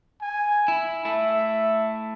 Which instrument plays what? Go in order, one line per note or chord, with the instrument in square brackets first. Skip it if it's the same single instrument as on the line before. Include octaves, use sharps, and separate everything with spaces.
[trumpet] G#5
[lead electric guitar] E4
[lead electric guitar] A3 E4 [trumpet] E5